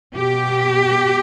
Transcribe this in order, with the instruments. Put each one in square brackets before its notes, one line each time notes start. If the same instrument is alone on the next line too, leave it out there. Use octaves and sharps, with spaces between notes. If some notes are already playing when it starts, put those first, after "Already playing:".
[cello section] B2 G4